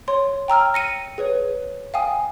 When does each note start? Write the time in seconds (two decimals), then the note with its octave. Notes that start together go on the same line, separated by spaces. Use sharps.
0.08 C#5 C6
0.48 G5 A#5 E6 F6
0.74 A#6 C#7 D#7
1.18 G#4 B4 C#5
1.94 F5 G5 G#5 D#6